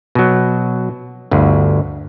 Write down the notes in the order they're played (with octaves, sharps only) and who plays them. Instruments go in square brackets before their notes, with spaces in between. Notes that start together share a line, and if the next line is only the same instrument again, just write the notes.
[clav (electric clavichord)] B2 F#3
G1 D2